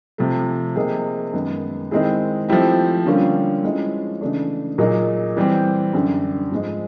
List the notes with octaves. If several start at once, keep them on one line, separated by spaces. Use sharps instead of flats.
C3 F3 A3
C3 F3 A#3 D#4 G#4
F#2 D#3 G#3 B3
D#3 G#3 C4 E4 G#4
F3 A3 C4 E4 G4
D3 G3 A#3 C#4 F4
F3 G#3 C#4 E4
C#3 E3 A3 D4
A#2 F#3 A#3 D#4 G#4
E3 G3 C4
F#2 D3 G3
G#2 F3 G#3